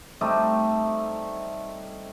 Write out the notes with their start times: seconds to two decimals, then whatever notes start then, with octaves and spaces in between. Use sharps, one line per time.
0.21 G3 A3 C4 D#4